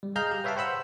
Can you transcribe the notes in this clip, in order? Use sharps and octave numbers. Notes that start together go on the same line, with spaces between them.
G3
G#4 D#5 F5 A#5 F6 G6
G4
B4 C#5 E5 F5 G5 A5
C5 F#5 B5 E6